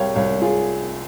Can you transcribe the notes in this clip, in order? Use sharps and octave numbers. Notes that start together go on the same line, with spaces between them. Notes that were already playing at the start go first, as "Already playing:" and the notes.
Already playing: C2 C3 G3 C#5 F5 G5
C2 C#5 F5
F4 G#4